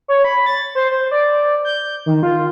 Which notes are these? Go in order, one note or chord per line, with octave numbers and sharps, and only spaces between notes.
C#5
B5
A6
C5
C5
D5
G6
D#3
F4